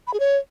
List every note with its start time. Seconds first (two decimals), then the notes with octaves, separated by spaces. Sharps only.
0.07 B5
0.14 G#4
0.20 C#5